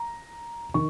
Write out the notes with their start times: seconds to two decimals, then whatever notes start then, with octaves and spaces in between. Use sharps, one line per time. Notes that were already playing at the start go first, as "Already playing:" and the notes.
Already playing: A#5
0.74 D#3 C#6